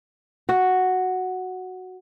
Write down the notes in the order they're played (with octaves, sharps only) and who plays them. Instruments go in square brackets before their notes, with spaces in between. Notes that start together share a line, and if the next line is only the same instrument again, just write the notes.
[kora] F#4